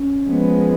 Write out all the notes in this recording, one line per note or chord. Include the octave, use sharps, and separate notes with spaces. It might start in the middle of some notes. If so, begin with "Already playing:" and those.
Already playing: C#4
F3 G#3 B3